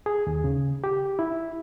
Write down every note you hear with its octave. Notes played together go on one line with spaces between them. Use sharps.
G#4
D#2
C#3
G4
E4